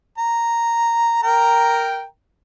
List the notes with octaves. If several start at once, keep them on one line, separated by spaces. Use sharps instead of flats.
A#5
A#4 G5 A#5